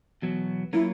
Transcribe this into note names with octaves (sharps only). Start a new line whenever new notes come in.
E2 B2 F#3 B3
F#3 A#3 C#4 E4 F4 A#4